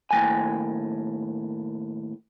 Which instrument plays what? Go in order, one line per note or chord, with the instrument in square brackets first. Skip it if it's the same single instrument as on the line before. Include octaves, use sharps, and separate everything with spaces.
[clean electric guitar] D#2 A2 F3 G5 G#5